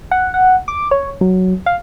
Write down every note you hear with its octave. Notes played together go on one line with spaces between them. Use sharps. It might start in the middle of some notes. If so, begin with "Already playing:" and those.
F#5
F#5
D6
C#5
F#3
F5